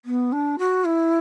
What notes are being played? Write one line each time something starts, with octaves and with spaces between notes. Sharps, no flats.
B3
D4
F#4
E4